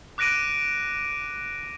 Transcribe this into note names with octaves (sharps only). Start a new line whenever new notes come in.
D6 F#6 A#6 D7 D#7